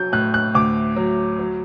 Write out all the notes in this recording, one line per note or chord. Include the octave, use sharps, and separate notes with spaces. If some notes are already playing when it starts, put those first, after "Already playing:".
Already playing: F#3 G6
A2 F#6
F#6
D2 D6
F#3
F#3